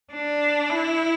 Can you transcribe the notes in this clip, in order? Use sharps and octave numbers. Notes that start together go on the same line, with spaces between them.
D4
E4